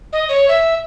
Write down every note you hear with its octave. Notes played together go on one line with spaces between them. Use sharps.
D#5
C#5
E5